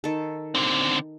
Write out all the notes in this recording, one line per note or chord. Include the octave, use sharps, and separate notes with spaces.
D#3 A4
D3 C4